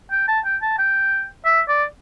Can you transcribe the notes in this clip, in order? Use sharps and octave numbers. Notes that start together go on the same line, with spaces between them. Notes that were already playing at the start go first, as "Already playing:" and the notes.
G5
A5
G5
A5
G5
E5
D5